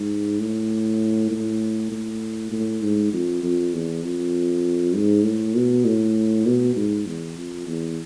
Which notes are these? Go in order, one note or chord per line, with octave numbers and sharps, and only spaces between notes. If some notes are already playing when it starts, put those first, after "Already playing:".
Already playing: G#2
A2
A2
A2
A2
G#2
F2
F2
E2
F2
G#2
A2
B2
A2
B2
G#2
E2
F2
E2